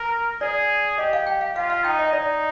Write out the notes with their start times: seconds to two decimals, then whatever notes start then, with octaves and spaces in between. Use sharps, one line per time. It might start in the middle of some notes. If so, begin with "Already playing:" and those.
Already playing: A#4
0.41 G#4 D5
0.98 G4 D#5
1.13 F5
1.27 G5
1.41 F5
1.56 F4 F5
1.70 F5
1.84 D#4 G5
1.99 D#5
2.13 D#4 D5